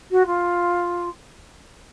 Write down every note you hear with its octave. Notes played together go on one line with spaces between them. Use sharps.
F#4
F4